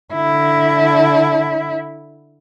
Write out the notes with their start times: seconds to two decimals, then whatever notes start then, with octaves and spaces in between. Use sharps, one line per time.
0.13 D3 E4